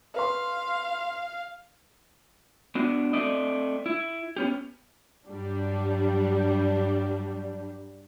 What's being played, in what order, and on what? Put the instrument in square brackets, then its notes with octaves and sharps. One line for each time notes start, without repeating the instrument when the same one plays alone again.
[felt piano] B4 C6 [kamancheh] F5
[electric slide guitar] B3 D4 F#4
A3 C4 D5 D#5
E4
B3 C#4 G4
[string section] G2 F#3 G3 D4